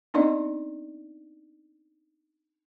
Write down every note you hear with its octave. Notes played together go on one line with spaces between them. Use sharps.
B3 C4 D4 D#4 D5 D#5